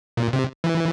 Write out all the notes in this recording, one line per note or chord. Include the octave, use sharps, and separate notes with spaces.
A#2
C3
E3